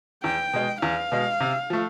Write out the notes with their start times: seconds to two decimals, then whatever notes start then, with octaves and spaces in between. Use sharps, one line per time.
0.23 E2 G5
0.53 B2 G#3
0.82 E2 F5
1.12 B2 G#3
1.40 C3
1.70 F3 A3